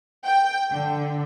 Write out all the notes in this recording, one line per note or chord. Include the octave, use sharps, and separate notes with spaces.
G5
D3